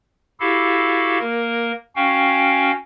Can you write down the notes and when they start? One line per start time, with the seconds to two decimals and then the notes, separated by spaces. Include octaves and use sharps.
0.40 E4 F#4 G4 A4 F5
1.20 A#3 A#4
1.96 C#4 F#4 F5 G5